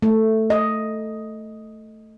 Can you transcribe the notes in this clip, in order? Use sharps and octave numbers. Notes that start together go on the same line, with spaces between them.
A3
D#5